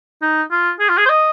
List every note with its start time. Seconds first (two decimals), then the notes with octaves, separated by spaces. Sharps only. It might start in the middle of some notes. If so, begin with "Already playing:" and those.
0.22 D#4
0.51 F4
0.80 G#4
0.89 F4
0.97 G#4
1.06 C5
1.09 D#5